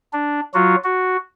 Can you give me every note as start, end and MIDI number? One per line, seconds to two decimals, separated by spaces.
0.13 0.40 62
0.54 0.75 54
0.54 0.75 65
0.54 0.75 66
0.84 1.17 66